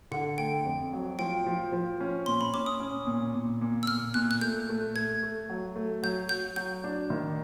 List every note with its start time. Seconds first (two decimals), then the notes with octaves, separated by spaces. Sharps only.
0.11 D3 F#5
0.38 A3 G5
0.65 F2
0.93 F#3
1.19 F3 G5
1.46 F3
1.72 F3
2.00 C#4
2.26 A#2 C6
2.41 B5
2.54 C#4 D6
2.66 D#6
2.80 C#4
3.07 A#2
3.35 A#2
3.61 A#2
3.83 E6
3.87 A#2 F6
4.14 A#2 F#6
4.31 F#6
4.41 A3 G6
4.69 A3
4.95 A3 G#6
5.23 A3
5.49 F#3
5.76 A3
6.03 F#3 G6
6.29 F#3 G6
6.56 F#3 G6
6.84 D4
7.10 D#3